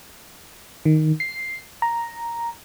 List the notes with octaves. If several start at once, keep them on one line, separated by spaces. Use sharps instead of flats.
D#3
C7
A#5